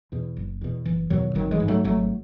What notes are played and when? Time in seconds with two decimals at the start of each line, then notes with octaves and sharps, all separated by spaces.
0.12 E2 B2
0.37 F#1
0.61 E2 B2
0.86 F#1 E3
1.10 E2 B2 D#3 F#3
1.35 G#1 D#3 F#3
1.51 E3 G#3
1.60 G#2
1.68 F#3 A3
1.84 G#1 F#3 A3